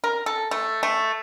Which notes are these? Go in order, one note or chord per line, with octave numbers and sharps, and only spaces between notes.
A#4
A4
A3
A3